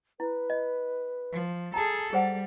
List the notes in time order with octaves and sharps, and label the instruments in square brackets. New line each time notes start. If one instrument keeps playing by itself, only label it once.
[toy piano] E4 [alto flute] B4
[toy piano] D#5
[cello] F3
[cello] G#4 A4 [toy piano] A5 A#5
[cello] G3 [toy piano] G#4 C5 F#5 [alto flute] A4